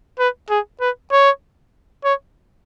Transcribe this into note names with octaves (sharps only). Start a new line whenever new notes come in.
B4
G#4
B4
C#5
C#5